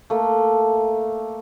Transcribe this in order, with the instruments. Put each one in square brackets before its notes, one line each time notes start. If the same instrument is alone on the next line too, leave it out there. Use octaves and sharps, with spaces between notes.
[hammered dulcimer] A3 A#3